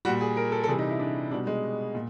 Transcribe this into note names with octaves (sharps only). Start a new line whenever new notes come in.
A#2 G3 F#4
G#4
A#4
A4
A4
C3 E3 G3 G#4
D#4
E4
D4
B2 G3 D4
G#3
A#2